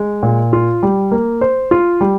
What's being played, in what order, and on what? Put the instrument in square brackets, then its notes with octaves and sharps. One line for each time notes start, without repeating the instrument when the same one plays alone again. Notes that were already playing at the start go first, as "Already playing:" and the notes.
Already playing: [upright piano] G#3
A#2
F4
G3
A#3
C5
F4
G3